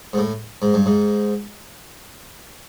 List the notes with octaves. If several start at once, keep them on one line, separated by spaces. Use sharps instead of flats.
G#2
A2
G#2
G2
G#2